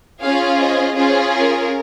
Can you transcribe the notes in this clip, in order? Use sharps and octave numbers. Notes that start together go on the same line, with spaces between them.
C#4 F4 G#4 C#5 F5
C5 D#5
C#4 F4 G#4 C5
A#4